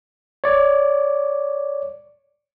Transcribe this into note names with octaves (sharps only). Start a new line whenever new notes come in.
C#5 D5